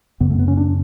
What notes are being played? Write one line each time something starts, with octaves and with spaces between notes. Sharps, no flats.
F#2 C#3 B3
A3
B3
C#4
D4